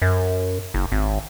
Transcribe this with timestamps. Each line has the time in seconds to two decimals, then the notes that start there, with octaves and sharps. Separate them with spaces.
0.02 F#2
0.74 F#1
0.92 G#1